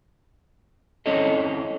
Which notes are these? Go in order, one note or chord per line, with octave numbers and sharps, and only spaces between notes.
C4 C#4 E4 A4 C#5 D#5